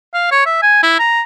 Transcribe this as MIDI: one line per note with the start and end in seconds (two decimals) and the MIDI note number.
0.14 0.29 77
0.31 0.45 73
0.46 0.63 76
0.63 0.83 80
0.83 0.97 64
0.99 1.22 82